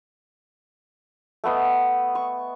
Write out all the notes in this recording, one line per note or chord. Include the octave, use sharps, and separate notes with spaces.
A3 B3 D#5
C#6